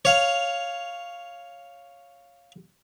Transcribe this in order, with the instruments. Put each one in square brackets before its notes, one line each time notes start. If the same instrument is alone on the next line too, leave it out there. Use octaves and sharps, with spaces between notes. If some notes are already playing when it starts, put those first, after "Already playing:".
[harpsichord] C#5 F5